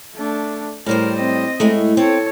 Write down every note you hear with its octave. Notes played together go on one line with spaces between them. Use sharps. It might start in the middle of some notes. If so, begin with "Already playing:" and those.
A3 D4
A2 G3 A#4 C5
C4 D#5
A2 G#3 A3
C4 A4 C#5